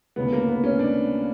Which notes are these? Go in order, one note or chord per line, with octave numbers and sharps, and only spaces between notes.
D2 C#3 E3 B3
A#3
B3
C#4
D4